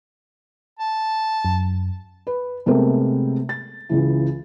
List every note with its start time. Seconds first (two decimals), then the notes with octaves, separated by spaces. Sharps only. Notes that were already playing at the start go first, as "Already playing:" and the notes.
0.79 A5
1.45 F#2
2.27 B4
2.66 C3 G#3 A3 B3 C4 A#4
3.49 A6
3.89 C#2 C#3 E3